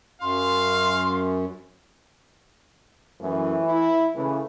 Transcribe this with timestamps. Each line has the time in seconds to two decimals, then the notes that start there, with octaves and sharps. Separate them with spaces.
0.22 F#2 F5 C6
3.21 F#2 E3 A3
3.64 E4
4.16 C#3 E3 A3